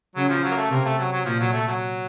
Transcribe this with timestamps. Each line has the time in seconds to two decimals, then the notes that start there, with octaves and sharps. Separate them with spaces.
0.16 C#3 F#3
0.29 F3
0.43 F#3
0.51 A#3
0.57 A3
0.71 C3 A#3
0.85 A3
0.99 F#3
1.12 F#3
1.25 A#2 F3
1.40 F#3
1.53 A3
1.67 F#3